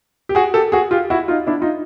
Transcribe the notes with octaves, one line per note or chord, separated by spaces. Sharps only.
G4
F#4 G#4
G4 A4
F#4 G#4
F4 G4
E4 F#4
D#4 F4
D4 E4
D#4 F4